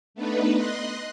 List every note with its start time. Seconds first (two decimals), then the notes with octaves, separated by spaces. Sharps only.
0.14 A3 B3 D4 D#4 B4
0.53 D#5 C6 F#6